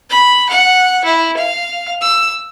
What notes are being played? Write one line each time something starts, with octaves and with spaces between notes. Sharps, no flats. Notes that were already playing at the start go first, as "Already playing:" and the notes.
B5
F#5
E4
F5
E6